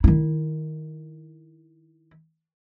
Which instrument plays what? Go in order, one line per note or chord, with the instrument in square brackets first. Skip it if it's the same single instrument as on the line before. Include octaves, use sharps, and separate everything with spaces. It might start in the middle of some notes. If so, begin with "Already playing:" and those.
[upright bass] D#3 E4